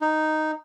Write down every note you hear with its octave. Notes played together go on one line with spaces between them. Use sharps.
D#4